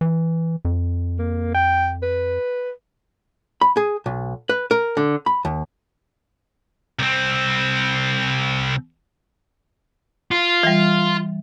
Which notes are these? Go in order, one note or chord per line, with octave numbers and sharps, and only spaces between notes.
E3
F2
A#3
G5
B4
B5
G#4
B1
B4
A#4
D3
B5
D#2
C2 C4
F4
E3 G3